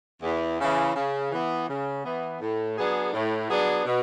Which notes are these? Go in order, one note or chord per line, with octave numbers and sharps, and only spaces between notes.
E2
C#3 E3
C#3
E3 B3
C#3
E3 B3
A2
F#3 B3 D4 G#4
A2
F#3 B3 D4 G#4
B2